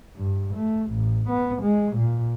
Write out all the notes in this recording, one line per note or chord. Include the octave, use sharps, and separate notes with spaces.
G2
A3
A1
B3
G#3
A#2